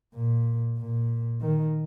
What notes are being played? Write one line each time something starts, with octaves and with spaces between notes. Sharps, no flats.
A#2
A#2
D#3